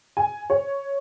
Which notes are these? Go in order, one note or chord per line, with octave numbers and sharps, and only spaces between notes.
G#5
C#5